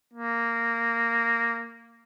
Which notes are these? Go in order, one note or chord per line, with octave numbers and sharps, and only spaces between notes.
A#3